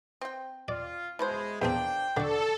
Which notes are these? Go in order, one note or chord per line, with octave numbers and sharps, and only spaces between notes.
C4 G5
F4 D5
B2 G#3 E4 C5
E2 F3 A#3 C4 D4 C5 G5
D3 F#4 A4 D5